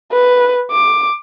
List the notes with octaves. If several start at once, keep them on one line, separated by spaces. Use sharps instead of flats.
B4
D6